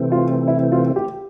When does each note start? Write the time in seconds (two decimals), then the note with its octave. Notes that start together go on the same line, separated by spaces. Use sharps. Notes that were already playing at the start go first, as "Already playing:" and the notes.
Already playing: C3 E3 A3 C4
0.12 F4
0.47 E4
0.72 F4
0.96 G4